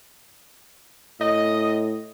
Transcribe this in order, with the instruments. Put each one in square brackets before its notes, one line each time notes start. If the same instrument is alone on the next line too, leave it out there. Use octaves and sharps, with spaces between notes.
[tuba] A2 [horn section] D#5